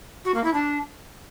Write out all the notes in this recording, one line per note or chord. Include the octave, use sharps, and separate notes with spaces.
F#4
A#3
E4
D4